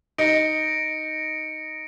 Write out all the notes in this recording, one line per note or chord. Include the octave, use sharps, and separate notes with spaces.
D#4 A#6 C#7 D7